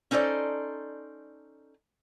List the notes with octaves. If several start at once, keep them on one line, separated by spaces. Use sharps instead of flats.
C#4 D#4 A4 C5 D5